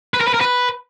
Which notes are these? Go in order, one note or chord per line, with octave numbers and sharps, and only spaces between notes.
B4
A#4
B4
A#4
B4